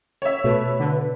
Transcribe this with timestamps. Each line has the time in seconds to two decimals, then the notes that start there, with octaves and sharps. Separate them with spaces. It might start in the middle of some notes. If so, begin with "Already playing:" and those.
0.22 C#5 E5
0.44 B2 A3 B4
0.80 D3